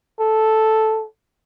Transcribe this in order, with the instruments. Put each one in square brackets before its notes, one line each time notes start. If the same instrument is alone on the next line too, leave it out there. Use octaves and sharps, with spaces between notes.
[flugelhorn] A4